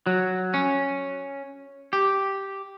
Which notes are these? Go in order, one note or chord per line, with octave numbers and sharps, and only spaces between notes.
F#3
C#4
G4